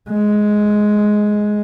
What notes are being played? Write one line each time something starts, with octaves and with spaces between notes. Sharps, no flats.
G#3